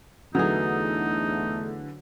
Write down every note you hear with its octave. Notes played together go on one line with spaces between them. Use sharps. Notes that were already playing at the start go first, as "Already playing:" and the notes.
E2 D3 E3 F#3 A3 D#4 G#4